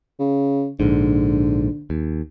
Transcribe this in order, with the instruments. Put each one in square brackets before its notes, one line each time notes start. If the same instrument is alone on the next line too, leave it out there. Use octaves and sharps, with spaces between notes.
[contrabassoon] C#3
[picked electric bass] A#1 G#2 [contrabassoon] D3
[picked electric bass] D#2